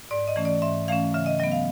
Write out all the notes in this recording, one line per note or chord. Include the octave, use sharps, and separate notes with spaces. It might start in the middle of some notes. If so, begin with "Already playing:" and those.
G#2 D5
D#5
E3 A3 C#4
D5
G#2 E5
E3 A3 C#4 F5
C#3 E5
D#5
F#3 B3 D#5
F5